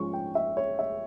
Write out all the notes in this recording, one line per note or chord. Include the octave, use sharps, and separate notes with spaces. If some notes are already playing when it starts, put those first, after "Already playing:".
Already playing: G#2 F3 G#3 C#4 C#6
G5
E5
C#5
E5